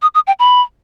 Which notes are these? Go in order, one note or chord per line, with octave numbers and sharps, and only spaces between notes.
D#6
D#6
G5
B5